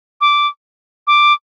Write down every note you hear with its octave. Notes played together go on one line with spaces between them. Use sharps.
D6
D6